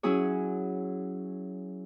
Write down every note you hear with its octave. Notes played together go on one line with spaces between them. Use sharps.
F#3 C#4 E4 G#4 C#5